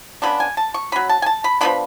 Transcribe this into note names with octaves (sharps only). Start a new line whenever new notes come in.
C#3 G#3 B3 D4 B5
G#5
A5
C#6
F#3 C#4 B5
A5
G#5
A5
B5
F3 B3 D4 B5